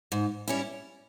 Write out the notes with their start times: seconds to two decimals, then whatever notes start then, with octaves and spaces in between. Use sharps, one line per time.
0.12 G#2
0.48 G3 C#4 E4